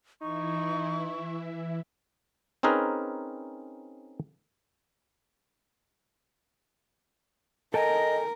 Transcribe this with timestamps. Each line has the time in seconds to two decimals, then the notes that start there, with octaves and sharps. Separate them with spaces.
0.22 E3 D#4 E4 C#6
2.63 C4 C#4 D#4 G#4 A#4 B4
7.74 A4 A#4 D#5 G5 G#5